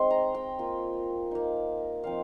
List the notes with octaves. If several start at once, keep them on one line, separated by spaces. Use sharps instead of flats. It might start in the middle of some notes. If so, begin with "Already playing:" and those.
Already playing: G#3 C4 D#4 C6
A#5
G5
A#3 F4
A#3 D#4
F3 C4 D#4 F5